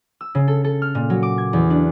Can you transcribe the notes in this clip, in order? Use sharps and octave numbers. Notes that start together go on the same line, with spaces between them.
E6
C#3
A4
A4
F6
A#2
F#3
D6
G#6
E2
D4